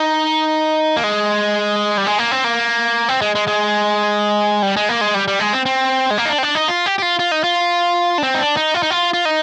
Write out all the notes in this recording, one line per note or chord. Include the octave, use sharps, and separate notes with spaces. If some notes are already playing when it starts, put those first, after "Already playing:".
Already playing: D#4
A#3
G#3
G3
G#3
A#3
C4
A#3
C4
G#3
G#3
G#3
G3
G#3
A#3
G#3
G3
G3
G#3
C4
C4
G#3
A#3
D#4
D4
C4
D4
D#4
F4
G4
G4
F4
F4
D#4
F4
D4
C4
D#4
D4
D#4
F4
D#4
F4
F4
D#4